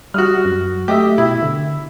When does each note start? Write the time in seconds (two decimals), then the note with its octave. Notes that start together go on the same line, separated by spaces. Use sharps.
0.14 G3 F#4 D#6 F6
0.45 F#2
0.88 A3 G4 D#5 E5
1.18 B2 E4
1.42 D3